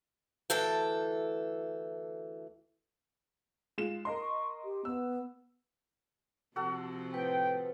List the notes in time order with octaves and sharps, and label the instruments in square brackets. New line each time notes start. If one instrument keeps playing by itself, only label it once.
[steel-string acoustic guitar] D2 E3 A4 G5
[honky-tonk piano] G#3 F4 E7
A#4 D#5 C6
[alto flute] C#6
G4
[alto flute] B3 [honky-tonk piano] E6
[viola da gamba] C3 F3 C4 [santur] F#4 A4 F#5
[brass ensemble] A2 G5 [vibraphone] B4 C5